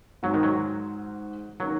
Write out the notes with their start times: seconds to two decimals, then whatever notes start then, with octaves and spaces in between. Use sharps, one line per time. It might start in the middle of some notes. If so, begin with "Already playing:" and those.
0.23 G#2 F#3 G#3 F#4
0.34 D#3
0.43 F#3
1.60 D#3 F#3 A#3 C#4